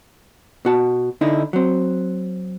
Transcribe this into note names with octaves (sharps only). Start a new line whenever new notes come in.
B2 F#4 A5
D3 D#4 E4
F#3 C4